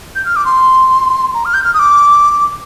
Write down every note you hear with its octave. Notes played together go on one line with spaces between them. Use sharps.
G6
F6
D6
C6
A#5
F6
G6
F6
D#6
D6